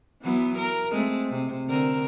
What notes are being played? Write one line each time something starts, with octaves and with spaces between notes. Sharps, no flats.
E3 F#3 B3
A#4
G#3 A3 C4
C3
D3 C4 A#4